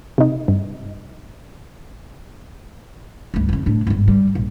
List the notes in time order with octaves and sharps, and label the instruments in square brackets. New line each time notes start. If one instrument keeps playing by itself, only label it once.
[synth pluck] C3 D#4
G2
[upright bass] C#2 G2
F2 C#3
A2 D4
G1 G#2
G3
A#1